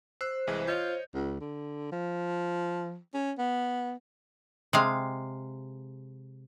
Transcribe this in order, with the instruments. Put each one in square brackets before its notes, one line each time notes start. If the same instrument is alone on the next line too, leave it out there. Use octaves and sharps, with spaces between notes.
[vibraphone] C5 [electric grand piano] E6 F#6
[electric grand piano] C2 E3 G#6 [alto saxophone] G#3
[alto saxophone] F4 [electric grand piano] C#5 D#5 G6
[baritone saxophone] C#2
D3
F3
C#4
B3
[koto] C3 G#3 F5